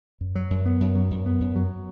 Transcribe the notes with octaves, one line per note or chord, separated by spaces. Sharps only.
F#2
F#3
F#2
B3
F#2
F#3
F#2
B3
F#2
F#3